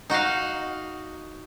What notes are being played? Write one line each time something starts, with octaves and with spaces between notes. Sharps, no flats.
D#4 F#4 D#5 F5